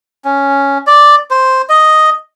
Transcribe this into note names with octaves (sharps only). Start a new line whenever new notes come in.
C#4
D5
C5
D#5